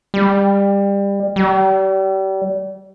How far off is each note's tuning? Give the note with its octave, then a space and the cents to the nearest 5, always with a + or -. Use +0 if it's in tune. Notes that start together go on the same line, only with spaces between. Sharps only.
G3 +25
G3 -35